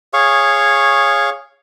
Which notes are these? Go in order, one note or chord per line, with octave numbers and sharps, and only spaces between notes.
G#4 C#5 F5 C#6